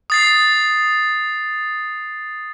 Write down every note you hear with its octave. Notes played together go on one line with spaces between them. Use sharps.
D#6 A6 C7